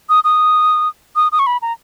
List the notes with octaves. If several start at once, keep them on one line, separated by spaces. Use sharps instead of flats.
D#6
D#6
D#6
D#6
C#6
B5
A#5